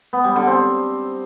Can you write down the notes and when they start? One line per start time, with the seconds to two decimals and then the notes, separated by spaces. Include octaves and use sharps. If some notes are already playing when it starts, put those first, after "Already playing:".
0.13 B3
0.24 G3
0.36 D3
0.47 C4